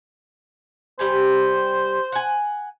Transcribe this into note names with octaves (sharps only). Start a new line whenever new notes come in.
G3 G4 C5 G#5
F#5 G#5